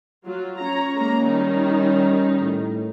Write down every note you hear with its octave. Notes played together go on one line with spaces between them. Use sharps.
F#3 F4
C#4 C#5 A#5
G#3 A#3 A#5
D#3 G3 D#4
A2